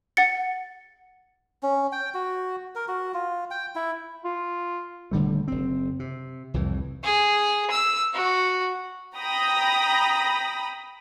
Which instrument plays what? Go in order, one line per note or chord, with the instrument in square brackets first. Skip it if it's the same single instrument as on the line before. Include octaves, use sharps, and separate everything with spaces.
[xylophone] F#5 A6 C#7
[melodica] C#4
G5
F#4
A#4
F#4
F4
G5
E4
[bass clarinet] F4
[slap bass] D#1 D3 G3 A3
F#1 C4
C3
C2 F2 A2 E3
[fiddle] G#4
E6
F#4
[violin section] G5 A#5 B5 D#6 A#6